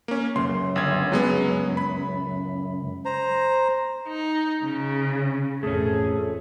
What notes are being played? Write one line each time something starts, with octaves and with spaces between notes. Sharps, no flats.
A#3 C#4
C#2 F#2 C6
G1 G#6
F#3 G#3 B3
B5
C5 A#5
D#4
C#3
A1 F2 A3 C#4 G#4 A4